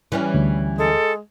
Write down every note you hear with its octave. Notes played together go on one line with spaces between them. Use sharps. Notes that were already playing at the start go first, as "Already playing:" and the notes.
E3 G3 C#4
D2
G#3 A4